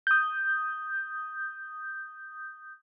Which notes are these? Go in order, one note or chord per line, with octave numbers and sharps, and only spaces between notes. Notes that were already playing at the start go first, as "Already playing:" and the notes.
D#6 G6